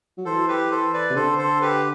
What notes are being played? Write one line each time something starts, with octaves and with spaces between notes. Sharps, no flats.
F#3
E3 A4 C5
G4 B4
A4 C5
B4 D5
C3
D3 A4 C5
A4 C5
G4 B4